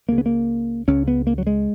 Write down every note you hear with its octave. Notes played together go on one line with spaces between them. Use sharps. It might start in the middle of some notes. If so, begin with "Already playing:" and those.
C#2 C#3 A#3
B3
A#3
C#2 C#3 C#4
B3
A#3
F#3
G#3